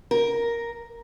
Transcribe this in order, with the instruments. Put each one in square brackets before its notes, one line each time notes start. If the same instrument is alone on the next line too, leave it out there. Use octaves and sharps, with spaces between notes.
[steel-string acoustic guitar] A#4